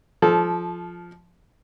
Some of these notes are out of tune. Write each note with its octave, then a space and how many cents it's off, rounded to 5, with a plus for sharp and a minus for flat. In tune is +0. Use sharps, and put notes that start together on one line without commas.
F3 +0 A4 -30